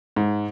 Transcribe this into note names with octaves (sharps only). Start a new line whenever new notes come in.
G#2